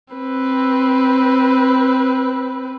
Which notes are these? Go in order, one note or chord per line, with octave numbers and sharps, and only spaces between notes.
C4 B4